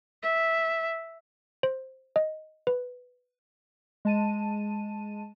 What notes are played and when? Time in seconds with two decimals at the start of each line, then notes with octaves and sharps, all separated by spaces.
0.23 E5
1.63 C5
2.16 D#5
2.67 B4
4.05 G#3 A5 D#7